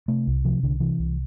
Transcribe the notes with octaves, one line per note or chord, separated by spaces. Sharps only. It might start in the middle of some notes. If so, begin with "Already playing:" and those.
C3 A3
C2
C3 F3
C2 D3
C3 E3
C2